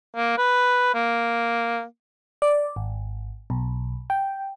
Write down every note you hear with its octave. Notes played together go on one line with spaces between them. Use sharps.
A#3
B4
A#3
D5
G#1
B1
G5